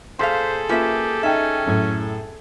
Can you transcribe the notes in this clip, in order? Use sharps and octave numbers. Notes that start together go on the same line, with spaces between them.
A#2 G#4 A4 C5 F5 C6 B6
A#3 C#4 F4 G4 B4 E5
C#4 D#4 E5 G5
F#2 A2 G#6